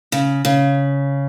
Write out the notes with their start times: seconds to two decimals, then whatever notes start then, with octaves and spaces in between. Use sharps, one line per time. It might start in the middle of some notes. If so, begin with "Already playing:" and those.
0.12 C#3
0.45 C#3